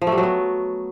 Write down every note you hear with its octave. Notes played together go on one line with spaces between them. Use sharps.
F3
A3
G3
F#3
B3